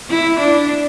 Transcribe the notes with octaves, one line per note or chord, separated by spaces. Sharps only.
E4
D4